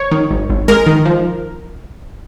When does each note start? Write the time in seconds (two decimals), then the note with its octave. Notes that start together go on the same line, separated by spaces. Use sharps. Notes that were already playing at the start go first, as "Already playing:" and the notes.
Already playing: C#5
0.11 D#3
0.31 G#1
0.49 G#1
0.68 G#3 A#4
0.86 D#3
1.05 F3